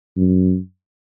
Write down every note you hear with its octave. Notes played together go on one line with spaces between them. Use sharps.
F#2